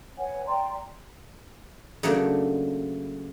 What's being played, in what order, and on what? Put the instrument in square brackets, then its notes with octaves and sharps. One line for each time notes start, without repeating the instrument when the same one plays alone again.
[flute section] B4 C#5 F#5 G#5
D5 G5 A#5 C6
[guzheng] C#3 F#3 A3 A#3 D4